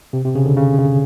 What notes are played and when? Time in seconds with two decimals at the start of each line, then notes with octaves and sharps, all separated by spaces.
0.13 C3
0.24 C3
0.35 C#3
0.46 D3
0.57 C#3
0.79 C#3